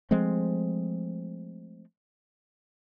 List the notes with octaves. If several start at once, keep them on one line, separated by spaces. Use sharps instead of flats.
F3 G#3 A3 C4